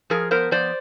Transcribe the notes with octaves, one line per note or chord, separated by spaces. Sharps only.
F3 G#4 A#4
B3 A#4 C5
F3 C5 D5